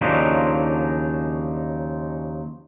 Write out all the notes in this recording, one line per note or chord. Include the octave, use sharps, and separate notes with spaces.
D#2 C#3 F3 F#3 D4 D#4